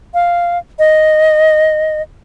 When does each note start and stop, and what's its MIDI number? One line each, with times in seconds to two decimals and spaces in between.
0.14 0.58 77
0.79 2.02 75